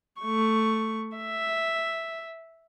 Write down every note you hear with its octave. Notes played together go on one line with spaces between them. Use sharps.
A3 C#6
E5